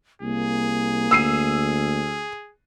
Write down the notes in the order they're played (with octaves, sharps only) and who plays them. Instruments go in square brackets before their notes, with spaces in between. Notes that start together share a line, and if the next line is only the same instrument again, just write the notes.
[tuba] C2 [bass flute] A#3 [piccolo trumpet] G#4
[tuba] D2 [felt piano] E6 C7 D#7